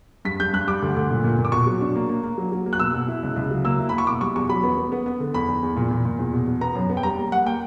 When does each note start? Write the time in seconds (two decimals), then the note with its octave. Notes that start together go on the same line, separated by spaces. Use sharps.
0.25 G2 B6
0.40 G2 G6
0.54 G2 F#6
0.67 G3 D6
0.82 D2
0.96 D2
1.11 A#2
1.24 A#2
1.39 A#2
1.45 D6
1.52 B2 C#6
1.67 F#3
1.81 D4
1.96 A#3
2.09 A#3
2.24 A#3
2.38 F#3
2.52 F#3
2.66 A#3
2.73 F#6
2.80 B2 E6
2.94 B2
3.08 E4
3.23 C#2
3.36 C#2
3.51 F#3
3.65 A#3 E6
3.79 E4
3.89 A#3 B5
3.98 C#6
4.07 B2 D6
4.21 G3 C#6
4.35 E2 C#6
4.49 F#3 B5
4.63 B3
4.77 B3
4.92 B3
5.06 B3
5.20 D3
5.34 E2 B5
5.48 E2
5.63 E2
5.76 A#2
5.91 A#2
6.05 A#2
6.19 E2
6.34 B2
6.47 B2
6.61 B3 A#5
6.75 F#2
6.90 B3
6.97 G5
7.03 G3 A#5
7.18 A#3
7.32 G3 F#5
7.46 A#3 G5